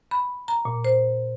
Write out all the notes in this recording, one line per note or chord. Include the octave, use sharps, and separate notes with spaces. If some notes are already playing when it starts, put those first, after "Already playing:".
B5
A#5
A#2
C5